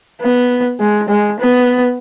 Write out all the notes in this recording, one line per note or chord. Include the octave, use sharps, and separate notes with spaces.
B3
G#3
G#3
B3